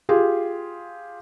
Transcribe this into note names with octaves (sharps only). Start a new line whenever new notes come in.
F4 G4 G#4